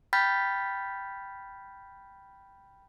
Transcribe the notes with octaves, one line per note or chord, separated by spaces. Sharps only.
G5 B5 F6 G6 A6 B6